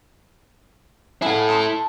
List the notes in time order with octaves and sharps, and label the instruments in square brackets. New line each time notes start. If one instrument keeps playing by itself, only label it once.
[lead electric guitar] E4 A4 [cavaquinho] G#4 F5 F#5
[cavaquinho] A5 C6 D#6